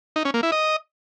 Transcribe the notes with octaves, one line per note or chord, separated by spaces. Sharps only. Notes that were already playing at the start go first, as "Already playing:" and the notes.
D#4
C#4
A#3
E4
D#5